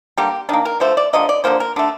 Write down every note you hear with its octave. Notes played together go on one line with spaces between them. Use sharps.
D3 G3 A#3 G4
D#3 A#3 D4
A#4
D3 F3 A3 C5
D5
D3 F3 A#3 D#5
D5
D3 F3 A#3 C5
A#4
D3 A3 D4